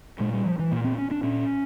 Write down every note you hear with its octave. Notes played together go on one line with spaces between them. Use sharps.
A#2 G#3
G3
F3
E3
A#2 A#3
C4
C#4
D4
A#2 C#4